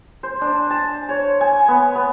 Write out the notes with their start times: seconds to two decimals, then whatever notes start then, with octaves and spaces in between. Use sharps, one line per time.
0.23 C5
0.41 D4
0.70 A5
1.09 C#5
1.41 G#5
1.68 B3
1.95 B3